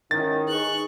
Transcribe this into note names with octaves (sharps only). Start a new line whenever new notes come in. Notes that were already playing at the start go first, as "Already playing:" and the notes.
G#2 D#3 C#4 E4 A6
D#4 G#4 B4 C#6 F#6